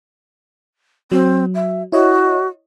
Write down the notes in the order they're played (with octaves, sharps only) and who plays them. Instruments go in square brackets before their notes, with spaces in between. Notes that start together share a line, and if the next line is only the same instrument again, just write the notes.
[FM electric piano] F#3 [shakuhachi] C4
[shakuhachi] E5
[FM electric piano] E4 C#5 D#5 [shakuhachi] F#4